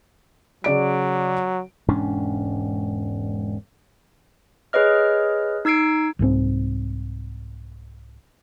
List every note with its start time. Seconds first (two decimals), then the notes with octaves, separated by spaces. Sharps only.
0.64 C#3 F#3 D5 D7
1.88 E1 G#2 C#4 D4
4.73 G#4 B4 C#5 D#5 F6
5.65 D#4 E6 G#6 C7 D7
6.19 C2 G#2 E3 C4